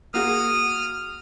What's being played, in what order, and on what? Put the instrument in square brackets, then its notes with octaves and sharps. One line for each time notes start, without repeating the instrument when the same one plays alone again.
[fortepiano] A#3 F#4 G#4 [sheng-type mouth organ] D#6 F6